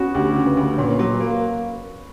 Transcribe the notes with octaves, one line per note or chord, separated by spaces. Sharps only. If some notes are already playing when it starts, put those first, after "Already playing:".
Already playing: B3 C#4 F#4
D2 G4
C#3
B4
D2
A#2 C#5
B4
C#5
F#3
B4
A#3